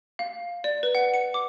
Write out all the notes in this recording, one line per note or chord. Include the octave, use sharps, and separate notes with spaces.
F5
D5
B4
F#5
C#7
D6